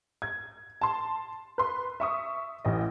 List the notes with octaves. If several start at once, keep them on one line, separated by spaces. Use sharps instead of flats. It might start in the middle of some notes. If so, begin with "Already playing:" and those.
G#6
A5 C6
B4 C6
E5 C#6 D#6
A1 D#5